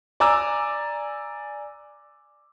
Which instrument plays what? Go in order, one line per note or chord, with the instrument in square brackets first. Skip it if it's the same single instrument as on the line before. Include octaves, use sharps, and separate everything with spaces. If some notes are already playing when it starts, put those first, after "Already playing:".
[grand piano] D5 G#5 A#5 D6 E6